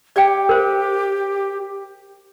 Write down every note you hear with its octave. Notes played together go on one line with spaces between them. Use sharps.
G4 D5 F5 G5
A#4 C5 F5